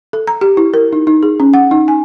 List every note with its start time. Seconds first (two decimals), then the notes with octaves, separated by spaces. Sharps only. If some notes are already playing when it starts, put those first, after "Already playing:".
0.13 A4
0.27 A#5
0.41 G4
0.57 E4
0.74 A#4
0.93 D#4
1.07 D#4
1.23 G#4
1.40 C#4
1.54 F#5
1.71 D#4
1.88 G#5